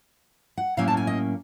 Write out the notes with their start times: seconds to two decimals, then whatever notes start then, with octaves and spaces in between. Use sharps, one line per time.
0.57 F#5
0.77 A2 F#3 A#3 C#4 F5
0.88 A5
0.97 G#5
1.07 D#5